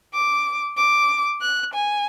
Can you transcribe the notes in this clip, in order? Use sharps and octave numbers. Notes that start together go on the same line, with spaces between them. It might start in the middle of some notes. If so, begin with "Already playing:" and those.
D6
D6
F#6
G#5